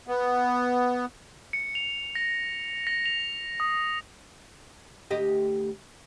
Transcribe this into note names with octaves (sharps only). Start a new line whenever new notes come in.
B3
C#7
F7
A#6
A#6
F7
D#6
D2 G4 D#5